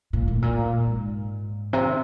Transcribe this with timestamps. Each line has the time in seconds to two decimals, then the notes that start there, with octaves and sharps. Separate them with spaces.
0.13 A#2
0.28 A2
0.42 A#2
0.86 G#2
1.73 C3